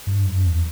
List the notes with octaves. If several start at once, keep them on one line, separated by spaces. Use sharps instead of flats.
G2
F#2
E2